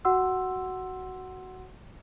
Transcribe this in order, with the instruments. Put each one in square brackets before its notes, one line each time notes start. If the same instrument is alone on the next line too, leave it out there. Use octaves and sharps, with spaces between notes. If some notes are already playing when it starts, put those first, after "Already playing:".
[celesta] F#4 F#5 C6 E6